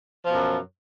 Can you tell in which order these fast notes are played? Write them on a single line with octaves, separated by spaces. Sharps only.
F3 B2 F#2